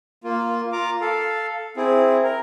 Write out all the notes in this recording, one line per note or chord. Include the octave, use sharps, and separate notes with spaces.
A#3 F4
F4 A#5 D6
A4 F5
C4 E4 G#4
A#4